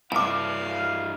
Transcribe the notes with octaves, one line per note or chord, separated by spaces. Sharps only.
G2 E4 F5 A5 D6